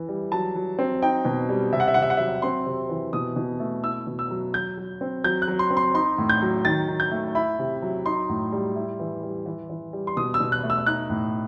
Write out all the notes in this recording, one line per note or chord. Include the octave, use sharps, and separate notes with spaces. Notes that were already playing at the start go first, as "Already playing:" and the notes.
Already playing: E3 E4
G3
F#3 A5
F#3
C4
D#4 G5
B2
G3
C3 E5
F#5
E5
C3 F#5
E5
F#5
F#3 E5
C4 C6
C3
E3
B2 D#6
B2
A3
E4 E6
B2
E6
F#3
F#3 G6
F#3
C4
F#3 G6
F#6
F#3
C6
C4
C6
D#4 C6
A2
G6
F#3
D#3 A6
D#3
G6
A3
E4 B5
C3
F#3
D#4 C6
A2
G3
E4
E3
G3
E3
E3
G3
C6
B2 D#6
E6
B2
F#6
A3
E6
D#4 F#6
A2